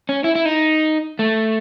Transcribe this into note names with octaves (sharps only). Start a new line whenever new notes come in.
C#4
E4
E4
D#4
A3